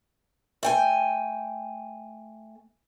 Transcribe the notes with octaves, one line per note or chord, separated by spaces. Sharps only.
A3 G5 G#5